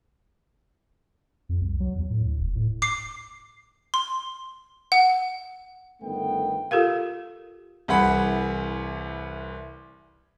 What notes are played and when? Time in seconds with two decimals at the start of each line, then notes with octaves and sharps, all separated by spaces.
1.49 F2
1.61 C2
1.80 F#3
1.96 E2
2.10 A2
2.25 D2
2.40 E1
2.55 A2
2.82 D6 C7
3.94 C6
4.92 F#5
6.02 G1 D#3 A3 B3 G5
6.71 F4 G4 A4 A#4 F5
7.88 C2 E3 G#4 F#5 B5